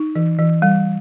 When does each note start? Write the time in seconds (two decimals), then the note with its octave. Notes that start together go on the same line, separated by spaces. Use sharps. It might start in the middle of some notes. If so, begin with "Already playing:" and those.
Already playing: D#4
0.15 E3
0.39 E3
0.62 G3